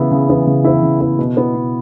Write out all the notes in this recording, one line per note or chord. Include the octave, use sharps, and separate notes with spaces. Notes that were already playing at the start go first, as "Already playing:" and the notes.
Already playing: C#3 E3 B3 E4
C#3
E3 B3 E4
C#3
E3 B3 E4
C#3
E3 B3 E4
B2
B3 E4
B2